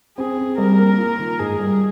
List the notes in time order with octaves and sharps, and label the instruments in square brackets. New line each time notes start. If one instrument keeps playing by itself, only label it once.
[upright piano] C4 [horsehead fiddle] G#4
[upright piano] C4
[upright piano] G3 [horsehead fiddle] A#4
[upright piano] A#3
F4
D#3
[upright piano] G#2 [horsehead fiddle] G#4
[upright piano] G3